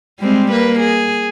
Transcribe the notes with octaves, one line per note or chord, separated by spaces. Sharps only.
G3 G#3 C4
A#3 B4
G#4